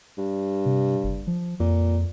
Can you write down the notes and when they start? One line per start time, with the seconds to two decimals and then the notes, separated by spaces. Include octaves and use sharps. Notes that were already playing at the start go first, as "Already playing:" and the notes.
0.18 G2
0.65 C3
1.04 F#1
1.27 F3
1.60 F2 A#2